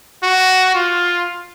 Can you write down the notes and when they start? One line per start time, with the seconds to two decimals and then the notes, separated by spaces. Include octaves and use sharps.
0.23 F#4
0.75 F4